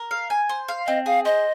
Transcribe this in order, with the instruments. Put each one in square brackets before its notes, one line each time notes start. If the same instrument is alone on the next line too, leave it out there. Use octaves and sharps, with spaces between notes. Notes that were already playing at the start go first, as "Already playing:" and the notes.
Already playing: [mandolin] A#4
F5
G#5
C5
F5
[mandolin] C4 [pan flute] D#5
[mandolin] G#4 [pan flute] F5
[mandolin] C5 [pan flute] D#5